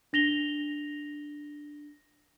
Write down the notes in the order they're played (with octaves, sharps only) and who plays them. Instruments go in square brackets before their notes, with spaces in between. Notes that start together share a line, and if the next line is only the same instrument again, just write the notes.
[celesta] D4 A#6 F7 G7